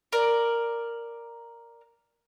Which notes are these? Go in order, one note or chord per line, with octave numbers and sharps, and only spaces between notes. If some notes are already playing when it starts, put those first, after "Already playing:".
A#4 D5